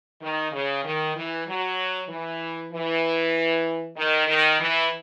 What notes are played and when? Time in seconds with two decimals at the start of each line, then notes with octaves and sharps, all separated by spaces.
0.21 D#3
0.52 C#3
0.84 D#3
1.16 E3
1.47 F#3
2.09 E3
2.72 E3
3.97 D#3
4.28 D#3
4.60 E3